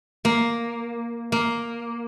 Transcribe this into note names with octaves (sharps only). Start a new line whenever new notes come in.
A#3
A#3